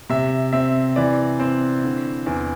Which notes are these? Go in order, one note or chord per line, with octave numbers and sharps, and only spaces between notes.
C3 E5
C4 E5
E3 D5
C4 C5
D3
E2